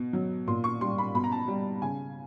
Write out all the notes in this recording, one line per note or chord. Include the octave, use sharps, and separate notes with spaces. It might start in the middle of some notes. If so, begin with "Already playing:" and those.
Already playing: B2
F#3
A#2 C6
C#6
G3 C6
B5
B2 B5
A#5
A5
G3
C#3 G#5